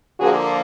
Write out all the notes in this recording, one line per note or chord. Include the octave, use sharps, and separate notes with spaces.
D3 F3 A#3 F#4 G#4